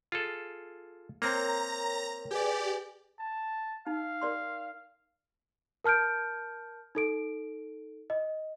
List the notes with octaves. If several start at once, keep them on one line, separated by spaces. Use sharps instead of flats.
F4 G#4 A4
A#3 C4 A#4 C#5 G5 A#5 A#6
G4 G#4 B4 D5 G#5
A5
D#4 F5
A#4 D5 C6
A#4 A5 F6 G6 D7
D#4 A4 D7
D#5